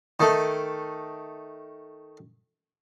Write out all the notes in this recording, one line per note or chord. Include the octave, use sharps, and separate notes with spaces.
D#3 A3